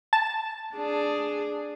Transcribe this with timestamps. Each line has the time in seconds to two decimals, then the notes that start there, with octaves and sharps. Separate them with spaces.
0.13 A5
0.75 D4 G#4